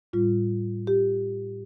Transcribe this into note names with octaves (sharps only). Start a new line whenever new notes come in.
A2 G3 F4
G4